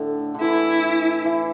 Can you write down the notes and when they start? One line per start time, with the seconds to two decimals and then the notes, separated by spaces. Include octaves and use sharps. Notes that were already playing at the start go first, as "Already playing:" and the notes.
Already playing: A2 D3
0.35 D3
0.41 E3 E4
1.25 E3